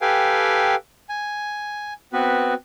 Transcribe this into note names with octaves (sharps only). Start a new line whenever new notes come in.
G4 A4 B4 F5 G5 G#5
G#5
B3 C4 F#4 B4